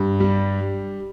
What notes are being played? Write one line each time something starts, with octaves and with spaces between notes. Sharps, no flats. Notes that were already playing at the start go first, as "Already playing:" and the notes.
Already playing: G2
G3